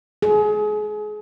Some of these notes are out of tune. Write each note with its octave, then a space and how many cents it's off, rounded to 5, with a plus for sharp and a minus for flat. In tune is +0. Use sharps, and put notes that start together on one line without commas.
G#4 +30